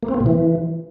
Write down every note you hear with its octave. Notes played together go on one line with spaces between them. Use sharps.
A#3
C4
A#3
B2
E3